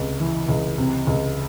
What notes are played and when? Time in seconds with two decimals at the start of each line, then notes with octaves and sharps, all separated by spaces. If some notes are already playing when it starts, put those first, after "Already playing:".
Already playing: C#2 C3
0.20 E3
0.48 C#2
0.78 C3
1.07 C#2